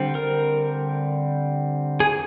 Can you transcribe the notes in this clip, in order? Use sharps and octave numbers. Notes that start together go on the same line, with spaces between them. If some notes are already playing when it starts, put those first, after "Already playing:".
Already playing: D3 G3 C4
A#4
G#4